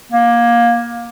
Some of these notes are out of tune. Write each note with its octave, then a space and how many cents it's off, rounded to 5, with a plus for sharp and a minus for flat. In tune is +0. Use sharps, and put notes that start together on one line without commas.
A#3 +20